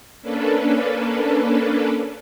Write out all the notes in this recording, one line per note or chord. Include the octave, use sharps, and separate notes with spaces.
A#3 C#4 D4 A4 B4